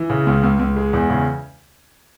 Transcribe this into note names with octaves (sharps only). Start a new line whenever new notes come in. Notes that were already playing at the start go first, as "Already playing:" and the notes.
Already playing: E3
C#3
C#2
C#2
C#2
G#3
E2
C#3